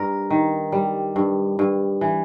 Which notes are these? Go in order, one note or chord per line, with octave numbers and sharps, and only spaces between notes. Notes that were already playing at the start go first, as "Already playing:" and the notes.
Already playing: G2 A#4
D#3
G3
G2
G2
E3